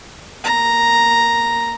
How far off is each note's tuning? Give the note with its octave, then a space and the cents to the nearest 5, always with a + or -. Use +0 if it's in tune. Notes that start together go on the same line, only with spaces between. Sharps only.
A#3 +0 A#5 +0